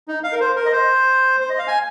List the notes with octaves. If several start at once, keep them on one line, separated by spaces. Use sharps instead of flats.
D#4
F5
A#4
C5
A#4
D#5
C5
C5
D#5
F5
G#5